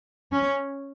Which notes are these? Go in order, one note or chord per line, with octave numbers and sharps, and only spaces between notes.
C#4